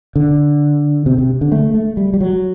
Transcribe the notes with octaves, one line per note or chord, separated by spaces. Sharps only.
D3
C3
C3
D3
A3
A3
G3
G3
F#3